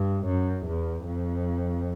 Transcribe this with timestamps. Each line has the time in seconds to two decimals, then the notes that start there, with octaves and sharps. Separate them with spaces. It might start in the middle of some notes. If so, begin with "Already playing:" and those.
Already playing: G2
0.25 F#2
0.66 E2
1.06 F2